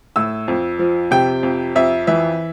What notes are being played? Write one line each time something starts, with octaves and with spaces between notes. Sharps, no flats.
A2 E6
F2
F3
C3 G5
F2
F2 E5
E3 E5